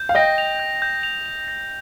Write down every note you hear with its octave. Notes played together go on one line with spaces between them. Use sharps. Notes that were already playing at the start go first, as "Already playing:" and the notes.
Already playing: G6
F5
D#5 G5 A#6
F7
G6
G6
F7
F7
A#6